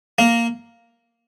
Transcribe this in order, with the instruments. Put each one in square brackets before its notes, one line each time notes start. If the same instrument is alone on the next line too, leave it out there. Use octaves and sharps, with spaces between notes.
[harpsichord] A#3